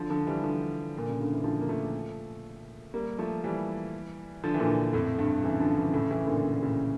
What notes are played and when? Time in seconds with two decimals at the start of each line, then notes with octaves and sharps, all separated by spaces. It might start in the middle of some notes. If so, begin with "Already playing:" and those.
Already playing: D3 F3
0.10 D3 F3
0.27 E3 G3
0.44 D3 F3
0.98 A#2
1.09 C#3
1.21 D3
1.32 E3
1.44 D3 F3
1.61 A#3
1.69 F3 A3
2.94 G3 A#3
3.18 F3 A3
3.44 E3 G3
4.44 D3 F3
4.54 E3
4.60 A#2 D3
4.93 F2 A2
5.19 G2
5.43 C#3 E3
5.60 D3 F3
5.77 C#3 E3
5.93 A2 C#3
6.11 C#3 E3
6.27 A#2 D3
6.44 C#3
6.54 A#2
6.63 A2 C#3